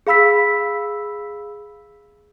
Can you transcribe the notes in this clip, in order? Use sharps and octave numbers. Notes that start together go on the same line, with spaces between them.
G#4 F5 B5 E6 B6